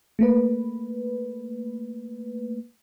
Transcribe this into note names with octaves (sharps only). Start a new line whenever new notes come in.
A3 A#3 B4